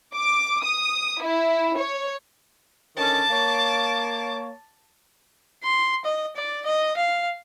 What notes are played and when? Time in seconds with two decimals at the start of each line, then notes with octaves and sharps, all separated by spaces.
0.15 D6
0.61 D#6
1.22 E4
1.77 C#5
2.97 D3 D#3 C#4 A5 D6
3.30 A#3 C#5
5.64 C6
6.05 D#5
6.36 D5
6.66 D#5
6.97 F5